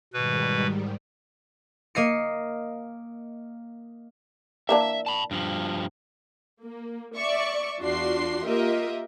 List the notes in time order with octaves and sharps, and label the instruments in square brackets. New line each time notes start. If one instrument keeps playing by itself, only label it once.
[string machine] G#2 D#3 G3 [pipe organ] B2 B4
[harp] A#3 D#5 C7 C#7
[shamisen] E3 A#3 D4 [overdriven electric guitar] E5
[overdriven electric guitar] A5 B5
G2 F3
[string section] A#3
D5 E5 C#6
E2 D4 F4 F#4 C6 C7
A#3 F4 G4 A#4 D#5 E5